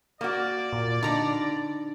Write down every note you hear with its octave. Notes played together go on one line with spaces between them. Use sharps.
A#3 F#4 C5 D5
A#2
D3 D#4 A#5 B5